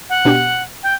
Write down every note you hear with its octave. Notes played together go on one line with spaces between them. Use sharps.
F#5
B2 D4 G4
G5